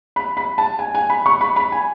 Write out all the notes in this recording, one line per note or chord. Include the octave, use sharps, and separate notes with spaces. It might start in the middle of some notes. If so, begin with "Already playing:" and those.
B5
B5
A5
G#5
G#5
B5
C#6
B5
B5
G#5